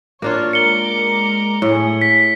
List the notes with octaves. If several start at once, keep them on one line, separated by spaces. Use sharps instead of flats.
A#3 D4 F4 C#5
G#3 A#4 D6 C#7 G7
A2 A3 G#4
B6